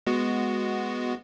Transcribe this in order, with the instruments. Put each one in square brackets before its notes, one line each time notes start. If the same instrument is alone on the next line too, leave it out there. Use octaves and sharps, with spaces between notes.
[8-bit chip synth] G#3 B3 F#4